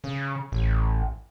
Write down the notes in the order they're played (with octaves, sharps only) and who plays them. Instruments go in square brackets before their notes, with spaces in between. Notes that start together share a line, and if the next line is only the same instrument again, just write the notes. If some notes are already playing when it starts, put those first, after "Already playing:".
[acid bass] C#3
A1